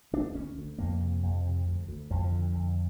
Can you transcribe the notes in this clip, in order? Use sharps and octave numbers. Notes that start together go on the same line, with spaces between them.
D2 D4
D2 C#4
D2
F2 A#3
C3
F2
C3
D2
D2
F2 F3
D3
F2